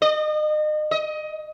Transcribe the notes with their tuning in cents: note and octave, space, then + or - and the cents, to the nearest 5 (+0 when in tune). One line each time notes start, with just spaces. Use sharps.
D#5 -35
D#5 +20